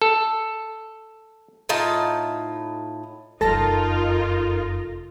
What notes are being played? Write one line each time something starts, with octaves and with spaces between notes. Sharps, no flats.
A4
A2 D#4 F4 A5
F1 F#2 D#4 F4 A4 A#4 A5 A#6